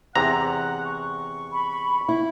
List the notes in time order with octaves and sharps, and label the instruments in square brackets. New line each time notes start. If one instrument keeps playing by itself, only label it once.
[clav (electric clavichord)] E2 C3 A#5 [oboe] F#5
[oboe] C#6
[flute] B5
[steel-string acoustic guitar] E4